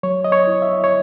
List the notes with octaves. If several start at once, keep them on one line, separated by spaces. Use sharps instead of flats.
F#3 C#5
D#5
C#5
E4
E5
C#5